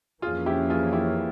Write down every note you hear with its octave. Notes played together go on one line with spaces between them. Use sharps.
F2 E3 A#3 C#4 F4 G#4
E4 G4
F4 G#4
E4 G4